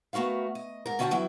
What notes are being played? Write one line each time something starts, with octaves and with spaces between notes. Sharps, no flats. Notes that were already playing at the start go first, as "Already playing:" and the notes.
A3 B3 F#4 A#4 F5
D#5
G#2 A#4
D3 C#4 F#4 E5 G5 A5
E2 F#3 E4 E5 G5